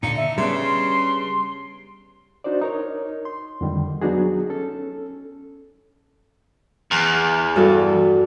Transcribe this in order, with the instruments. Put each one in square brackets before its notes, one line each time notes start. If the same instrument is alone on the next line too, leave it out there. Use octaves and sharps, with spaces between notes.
[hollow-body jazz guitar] A#2 D3 [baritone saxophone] D#4 [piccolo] C#7
[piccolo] E5
[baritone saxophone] C#3 [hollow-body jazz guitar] G3 B3 D4 [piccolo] C6
[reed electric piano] D4 D#4 F#4 C5 D5
D#4 A#4 C#5
C6
F2 D3 D#3 G3
F#3 B3 D4 D#4 F#4 G#4
C#4 A4
[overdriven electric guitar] E2
[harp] G2 F#4 A4